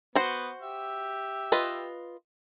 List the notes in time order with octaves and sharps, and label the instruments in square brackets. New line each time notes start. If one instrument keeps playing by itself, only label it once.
[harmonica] B3 [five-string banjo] F#4 C5
[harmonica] G4 E5
[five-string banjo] F4 B4 D#5